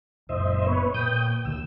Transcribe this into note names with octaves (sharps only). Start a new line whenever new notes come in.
F#1 F#2 A#2 C5 D#5 E5
B3 B4 C#5
A#2 G5 D#6 G6
D2 D#3 E6